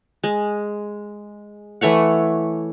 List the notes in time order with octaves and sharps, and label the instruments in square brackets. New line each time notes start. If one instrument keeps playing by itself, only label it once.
[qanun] G#3
E3 A3 C#5 F#5